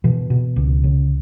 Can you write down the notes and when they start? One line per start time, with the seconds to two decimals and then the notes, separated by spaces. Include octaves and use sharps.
0.04 B2 E3
0.30 B2
0.56 C#2
0.84 C#3